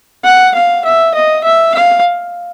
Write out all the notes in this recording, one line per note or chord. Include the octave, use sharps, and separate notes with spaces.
F#5
F5
E5
D#5
E5
F5